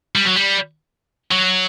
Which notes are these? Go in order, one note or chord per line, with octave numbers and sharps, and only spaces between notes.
G3
F#3
G3
F#3